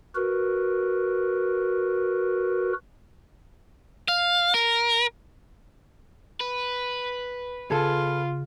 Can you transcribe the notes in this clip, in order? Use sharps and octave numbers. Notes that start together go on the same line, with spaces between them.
F#4 A#4 B4
F5
A#4
B4
C#3 F4 G#4 A4